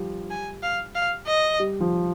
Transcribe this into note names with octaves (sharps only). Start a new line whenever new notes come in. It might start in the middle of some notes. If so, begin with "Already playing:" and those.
Already playing: F3 G3
G#5
F5
F5
D#5
G3
F3